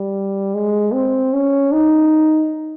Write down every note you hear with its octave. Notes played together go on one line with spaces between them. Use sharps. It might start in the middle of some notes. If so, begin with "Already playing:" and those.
Already playing: G3
G#3
C4
C#4
D#4